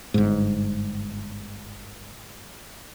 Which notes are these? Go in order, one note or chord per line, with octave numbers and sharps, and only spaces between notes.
G1 G#2